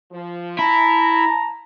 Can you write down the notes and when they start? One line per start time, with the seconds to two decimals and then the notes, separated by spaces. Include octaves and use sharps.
0.12 F3
0.59 E4 A5 A#5